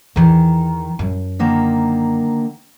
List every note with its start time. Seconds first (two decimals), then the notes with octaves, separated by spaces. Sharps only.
0.16 E2 D#3 E3
0.99 F#2
1.39 D3 D#3 A#3